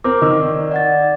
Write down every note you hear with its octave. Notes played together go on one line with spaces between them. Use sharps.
C4 A#4 D6
D#3 D#5 E6
D5
D5 F#5 A6